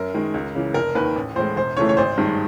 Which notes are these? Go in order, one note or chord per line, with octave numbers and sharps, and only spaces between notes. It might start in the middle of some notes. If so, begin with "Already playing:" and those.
Already playing: F#2 A#4
D#3 G#3
C#2
C#3 E3
F1 A#4
D#2 D#3 B4
A1
A2 E3 G#3 C5
E1 C5
D2 C#3 E3 A3 C#5
C#5
G#1 C5
G2 D#3 G#3